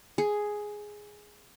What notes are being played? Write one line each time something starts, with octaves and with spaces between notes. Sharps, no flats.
G#4